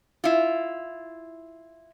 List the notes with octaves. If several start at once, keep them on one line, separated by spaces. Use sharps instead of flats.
E4 F4